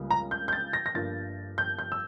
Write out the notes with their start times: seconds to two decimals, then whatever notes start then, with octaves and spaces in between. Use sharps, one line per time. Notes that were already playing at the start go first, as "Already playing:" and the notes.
Already playing: C#2 C#3 G3 A#3
0.11 A#5
0.31 G6
0.48 G6
0.53 A6
0.73 A#6
0.86 A#6
0.94 G1 G2 F3 A#3 A6
1.58 G6
1.79 G6
1.92 E6